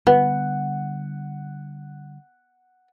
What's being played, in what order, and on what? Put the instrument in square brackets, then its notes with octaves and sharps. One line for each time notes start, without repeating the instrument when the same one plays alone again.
[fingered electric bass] D3 G3 [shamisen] B3 [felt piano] F#5